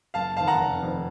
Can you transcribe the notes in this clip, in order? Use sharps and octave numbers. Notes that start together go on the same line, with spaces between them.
F#1 F5 A5
F2 D#3 F5 A5
F#5 A#5
F1
F2 D#3